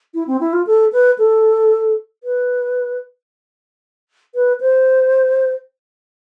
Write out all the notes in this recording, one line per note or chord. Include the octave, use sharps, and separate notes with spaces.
E4
C4
E4
F4
A4
B4
A4
B4
B4
C5